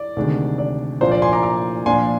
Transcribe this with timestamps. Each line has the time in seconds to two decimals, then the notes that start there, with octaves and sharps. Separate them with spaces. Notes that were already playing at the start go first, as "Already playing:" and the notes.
Already playing: D5
0.17 D2 C3 D#3 G#3 D4
0.58 D5
1.01 A#2 F3 A#3 D4 C5
1.11 D5
1.22 G#5 C6
1.33 A#5 D6
1.43 A#5 D6
1.86 A#2 F3 A#3 D4 G#5 C6